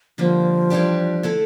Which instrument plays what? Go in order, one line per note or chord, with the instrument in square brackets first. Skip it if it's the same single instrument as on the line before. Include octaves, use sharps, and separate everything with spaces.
[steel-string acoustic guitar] D3 G3 A#3 [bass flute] F3
[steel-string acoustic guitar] E3 G3 D4 G4
D3 A3 E4 A4